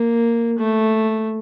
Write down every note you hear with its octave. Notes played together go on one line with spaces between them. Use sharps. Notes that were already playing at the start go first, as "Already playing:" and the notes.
Already playing: A#3
A3